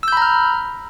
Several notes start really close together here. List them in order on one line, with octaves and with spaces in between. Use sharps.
E6 G6 B5 A#5 F6